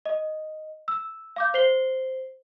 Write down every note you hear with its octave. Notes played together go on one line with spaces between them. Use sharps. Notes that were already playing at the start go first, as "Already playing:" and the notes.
D#5
E6
F5 D6 G6
C5 C7 G7